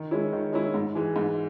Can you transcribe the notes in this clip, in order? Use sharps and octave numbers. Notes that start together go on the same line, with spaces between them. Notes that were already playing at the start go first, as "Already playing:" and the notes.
Already playing: D#3
G#3 C#4 E4
D#3
G#3 C#4 E4
G#2
E3 G#3
G#2